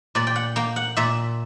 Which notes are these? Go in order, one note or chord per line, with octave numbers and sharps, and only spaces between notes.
A#2 D5
G5
F#5
A#3 G5
F#5
A#2 E5